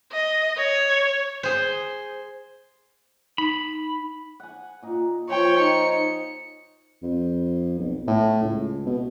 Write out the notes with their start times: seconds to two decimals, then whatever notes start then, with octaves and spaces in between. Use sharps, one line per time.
0.12 D#5
0.57 C#5
1.43 G#4 C5
3.38 D#4 B5
4.40 F#5 G#5
4.83 A#2 D#4
5.29 F3 C#5 G5 C6
5.60 D#4 C#7
7.03 F2
7.78 B1
8.07 A2
8.43 C#2
8.86 B2